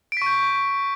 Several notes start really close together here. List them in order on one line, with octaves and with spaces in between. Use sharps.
D7 B6 C#6 G6